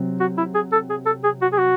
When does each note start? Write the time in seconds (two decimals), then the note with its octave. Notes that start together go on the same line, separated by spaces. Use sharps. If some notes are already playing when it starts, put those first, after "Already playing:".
Already playing: C3 F#3 C4
0.20 F#4
0.38 E4
0.54 G#4
0.72 A4
0.90 G#4
1.06 A4
1.24 G#4
1.42 F#4
1.52 G#4
1.58 F#4